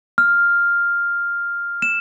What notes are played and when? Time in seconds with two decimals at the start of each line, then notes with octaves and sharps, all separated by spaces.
0.18 F6
1.82 E7